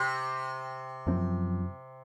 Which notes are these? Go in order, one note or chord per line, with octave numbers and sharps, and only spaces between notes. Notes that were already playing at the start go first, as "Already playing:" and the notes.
Already playing: C3
F#2 F3 C4